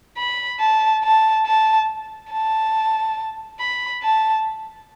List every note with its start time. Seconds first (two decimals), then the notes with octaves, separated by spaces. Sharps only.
0.18 B5
0.60 A5
1.03 A5
1.46 A5
2.32 A5
3.60 B5
4.02 A5